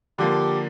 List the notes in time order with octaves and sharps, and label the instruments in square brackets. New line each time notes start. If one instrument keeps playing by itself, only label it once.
[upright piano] D3 F3 A#3 [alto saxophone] G4